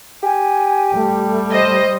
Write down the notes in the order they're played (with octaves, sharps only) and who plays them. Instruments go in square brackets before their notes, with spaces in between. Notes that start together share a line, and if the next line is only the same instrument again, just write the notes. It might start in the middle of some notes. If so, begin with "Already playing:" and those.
[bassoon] G4 [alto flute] G#5
[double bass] G3 [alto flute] A3
[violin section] C5 D#5